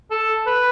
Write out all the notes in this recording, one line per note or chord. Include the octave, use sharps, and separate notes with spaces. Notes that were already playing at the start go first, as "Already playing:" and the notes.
A4
B4